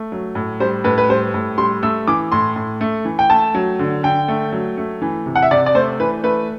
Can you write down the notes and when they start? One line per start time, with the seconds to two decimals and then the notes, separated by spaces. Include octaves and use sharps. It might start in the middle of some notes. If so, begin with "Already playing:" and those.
Already playing: A3
0.12 F#3
0.35 A2
0.60 G3 C5
0.84 A2 B4
0.98 B4
1.09 G3 C5
1.34 A2
1.58 G3 C6
1.83 A3 E6
2.08 E3 D6
2.32 A2 C6
2.56 A2
2.81 A3
3.05 E3
3.19 G5
3.30 A3 A5
3.55 F#3
3.79 D3
4.03 D3 G5
4.28 A3
4.52 F#3
4.78 A3
5.02 E3
5.26 C3
5.36 F#5
5.42 E5
5.51 C3 D5
5.66 D5
5.74 A3 C5
6.00 E3 B4
6.23 A3 B4